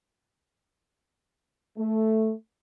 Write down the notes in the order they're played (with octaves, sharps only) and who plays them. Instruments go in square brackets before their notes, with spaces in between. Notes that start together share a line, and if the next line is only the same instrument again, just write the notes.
[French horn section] A3